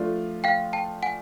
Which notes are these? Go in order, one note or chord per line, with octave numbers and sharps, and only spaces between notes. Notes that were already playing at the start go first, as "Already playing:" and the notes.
Already playing: F3 A3 D4 F4
F5 G5
G5 A5
F#5 G#5